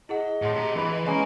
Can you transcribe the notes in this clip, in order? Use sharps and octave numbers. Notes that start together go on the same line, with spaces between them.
E4 G#4 D#5 F#5
A2 G#4 F#5 C6
G4 A#5 D6
E3 E4 B4 B5
G#3 C#4 B4 F5 G#5 A#5